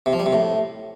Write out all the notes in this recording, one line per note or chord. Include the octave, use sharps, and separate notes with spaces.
C3
F3
G3
C3
A2